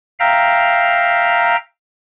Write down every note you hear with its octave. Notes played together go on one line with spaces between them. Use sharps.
E5 F5 G5 A#5